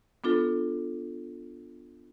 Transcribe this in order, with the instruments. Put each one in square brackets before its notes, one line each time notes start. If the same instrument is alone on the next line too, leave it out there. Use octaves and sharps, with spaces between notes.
[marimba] B3 D4 F4 A4